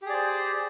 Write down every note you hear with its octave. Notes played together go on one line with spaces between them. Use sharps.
G4 G#4 C5 D5